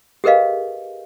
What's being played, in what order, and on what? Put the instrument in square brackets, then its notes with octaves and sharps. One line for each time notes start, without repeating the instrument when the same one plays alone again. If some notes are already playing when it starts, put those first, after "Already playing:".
[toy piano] G4 G#4 A#4 B4 D#5 F5